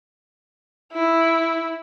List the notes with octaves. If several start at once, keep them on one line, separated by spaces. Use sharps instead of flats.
E4